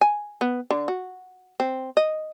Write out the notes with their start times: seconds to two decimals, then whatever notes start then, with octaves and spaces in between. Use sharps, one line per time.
0.01 G#5
0.41 B3
0.71 D3
0.88 F#4
1.60 C4
1.97 D#5